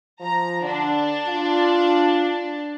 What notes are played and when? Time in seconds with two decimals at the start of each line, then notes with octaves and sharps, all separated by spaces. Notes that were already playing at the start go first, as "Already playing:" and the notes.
0.20 F3 A#5
0.62 D3 D4
1.27 F4